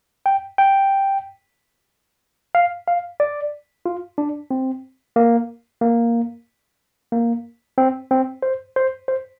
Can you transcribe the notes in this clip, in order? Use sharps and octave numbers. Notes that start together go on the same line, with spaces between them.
G5
G5
F5
F5
D5
F4
D4
C4
A#3
A#3
A#3
C4
C4
C5
C5
C5